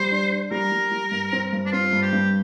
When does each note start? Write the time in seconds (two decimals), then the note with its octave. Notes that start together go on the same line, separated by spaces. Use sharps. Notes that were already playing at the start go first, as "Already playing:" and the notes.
Already playing: G3 C5
0.12 D4
0.31 D4
0.51 G3 A#4
0.72 G3
0.91 G3
1.11 G2
1.33 C4
1.53 G2
1.66 D4
1.72 C4 F4
1.93 G2
2.02 G4
2.13 G2